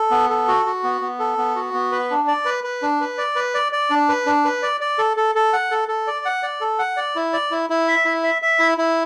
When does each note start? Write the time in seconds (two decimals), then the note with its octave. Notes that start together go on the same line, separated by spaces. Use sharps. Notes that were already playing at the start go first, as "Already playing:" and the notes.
Already playing: A4
0.11 B3
0.30 A4
0.48 F#4
0.66 F#4
0.83 B3
1.01 B3
1.19 A4
1.38 B3
1.56 F#4
1.74 B3
1.92 B4
2.11 D4
2.28 D5
2.45 B4
2.64 B4
2.82 D4
3.01 B4
3.18 D5
3.36 B4
3.55 D5
3.72 D5
3.90 D4
4.09 B4
4.26 D4
4.45 B4
4.63 D5
4.81 D5
4.98 A4
5.17 A4
5.35 A4
5.53 F#5
5.71 A4
5.88 A4
6.07 D5
6.25 F#5
6.43 D5
6.61 A4
6.79 F#5
6.97 D5
7.16 E4
7.33 D5
7.51 E4
7.70 E4
7.88 E5
8.05 E4
8.24 E5
8.42 E5
8.59 E4
8.78 E4